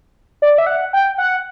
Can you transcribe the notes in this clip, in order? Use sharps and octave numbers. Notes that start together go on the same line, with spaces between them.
D5
E5
F#5
G5
F#5